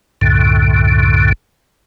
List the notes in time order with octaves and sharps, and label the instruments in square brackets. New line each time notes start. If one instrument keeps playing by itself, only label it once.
[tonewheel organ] C2 F#2 A2 D3